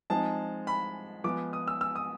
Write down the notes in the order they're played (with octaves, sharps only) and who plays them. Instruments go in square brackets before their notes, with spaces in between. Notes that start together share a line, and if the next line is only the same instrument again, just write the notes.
[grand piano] F3 G#3 C4 D#4 A5
B5
F3 G#3 B3 D6
D#6
E6
E6
D#6